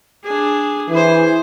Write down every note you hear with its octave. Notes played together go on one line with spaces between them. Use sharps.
D4 G#4
E3 G#4 C5